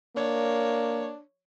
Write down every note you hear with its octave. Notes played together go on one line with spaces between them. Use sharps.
A#3 D4 C#5